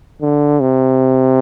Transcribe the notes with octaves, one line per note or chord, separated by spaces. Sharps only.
D3
C3